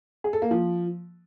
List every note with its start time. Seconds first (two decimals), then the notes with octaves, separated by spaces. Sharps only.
0.24 G#4
0.33 A4
0.42 A#3
0.51 F3